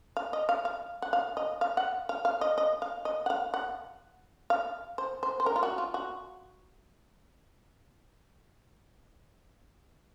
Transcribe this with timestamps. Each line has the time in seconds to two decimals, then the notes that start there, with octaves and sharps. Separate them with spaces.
0.17 F5
0.33 D#5
0.49 F5
0.65 F5
1.02 F#5
1.13 F5
1.37 D#5
1.61 F5
1.77 F#5
2.09 F5
2.25 F5
2.41 D#5
2.58 D#5
2.82 F5
3.05 D#5
3.26 F#5
3.30 F5
3.54 F#5
4.50 F5
4.98 C5
5.23 C5
5.40 C5
5.46 A#4
5.56 F4
5.63 F#4
5.78 F4
5.94 F#4